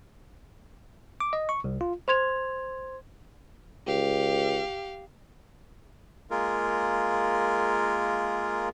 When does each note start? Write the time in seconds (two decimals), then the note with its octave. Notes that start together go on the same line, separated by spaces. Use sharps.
1.20 D6
1.33 D#5
1.49 C#6
1.64 C2
1.81 F4
2.08 C5 C6 G#6 F7
3.87 C#2 G4 F5
6.31 G#3 A#3 F4 G#4 A#4